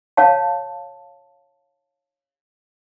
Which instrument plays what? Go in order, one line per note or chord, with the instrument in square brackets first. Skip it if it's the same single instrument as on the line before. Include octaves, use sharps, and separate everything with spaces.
[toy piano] C#5 F5 A5